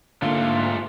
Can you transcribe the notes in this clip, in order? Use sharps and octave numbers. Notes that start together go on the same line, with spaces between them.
G#2 D3 A3 A#3 F4 F5